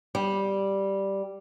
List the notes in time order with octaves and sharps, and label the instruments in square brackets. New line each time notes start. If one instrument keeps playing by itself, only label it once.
[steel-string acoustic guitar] G3